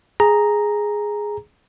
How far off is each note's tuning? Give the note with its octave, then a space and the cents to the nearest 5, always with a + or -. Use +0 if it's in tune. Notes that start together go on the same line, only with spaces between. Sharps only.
G#4 +0 A#5 +0